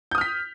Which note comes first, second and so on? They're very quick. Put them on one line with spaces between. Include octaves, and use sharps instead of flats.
G6 D#6 F6 B6